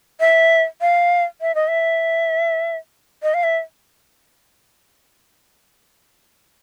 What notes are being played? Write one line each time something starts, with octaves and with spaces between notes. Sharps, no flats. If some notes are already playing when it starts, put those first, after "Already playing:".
E5
F5
E5
D#5
E5
D#5
F5
E5